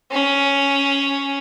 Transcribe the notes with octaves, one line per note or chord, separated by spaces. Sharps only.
C#4